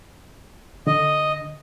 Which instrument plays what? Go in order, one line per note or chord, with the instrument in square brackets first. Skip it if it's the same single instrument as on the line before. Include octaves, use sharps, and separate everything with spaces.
[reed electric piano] D3 [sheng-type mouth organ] D#5